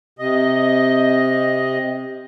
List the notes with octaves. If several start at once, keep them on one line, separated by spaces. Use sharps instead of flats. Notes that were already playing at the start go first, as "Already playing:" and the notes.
C3 D#5